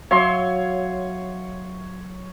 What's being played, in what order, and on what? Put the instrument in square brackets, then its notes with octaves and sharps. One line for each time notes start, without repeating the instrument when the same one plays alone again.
[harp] F#3 E5 F5 [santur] C#5 C6